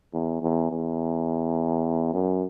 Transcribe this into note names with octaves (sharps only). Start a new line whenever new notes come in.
E2
E2
E2
F#2